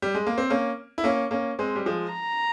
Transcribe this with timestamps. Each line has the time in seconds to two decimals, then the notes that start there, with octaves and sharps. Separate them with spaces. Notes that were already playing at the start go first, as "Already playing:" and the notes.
0.02 G3
0.15 G#3
0.27 A#3
0.38 C4
0.50 A#3 C#4
0.98 E4
1.04 A#3 C#4
1.31 A#3 C#4
1.59 G#3 C4
1.76 G3
1.86 F3 G#3
2.13 A#5